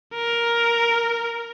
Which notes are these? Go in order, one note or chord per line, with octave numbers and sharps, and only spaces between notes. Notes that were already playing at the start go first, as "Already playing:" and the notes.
A#4